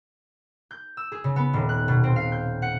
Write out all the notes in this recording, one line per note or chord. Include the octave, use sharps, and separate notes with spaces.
G6
E6
G#4
C#3
B3
D#1
F#6
B2
C4
F5
G6
F#5